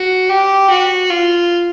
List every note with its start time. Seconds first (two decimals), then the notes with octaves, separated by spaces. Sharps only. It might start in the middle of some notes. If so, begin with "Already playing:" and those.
Already playing: F#4
0.29 G4
0.70 F#4
1.11 F4